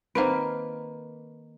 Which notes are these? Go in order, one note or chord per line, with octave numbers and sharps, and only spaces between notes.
D#3 A#3 C4 B4 C5